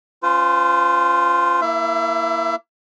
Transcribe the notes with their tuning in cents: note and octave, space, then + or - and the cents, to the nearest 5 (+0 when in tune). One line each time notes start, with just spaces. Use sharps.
C#4 +0 F4 +0 C5 -40
A#3 +0 E4 +0 E5 +35